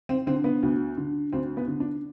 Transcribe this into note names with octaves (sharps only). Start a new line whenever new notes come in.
C4
D3 C4
B3
D2
D3
D2 C4
B3
D3
D4